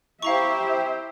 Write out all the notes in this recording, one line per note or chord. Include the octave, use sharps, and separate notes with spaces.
E4 G4 C5 E5 F5 A#5 C#6